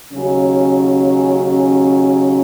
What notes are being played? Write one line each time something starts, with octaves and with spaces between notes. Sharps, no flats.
D#2 C#3 F#3 C#4